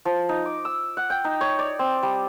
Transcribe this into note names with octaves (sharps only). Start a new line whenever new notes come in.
F3
D#4
D6
E6
F#5
G5
D#4
C#5
D5
C4
G3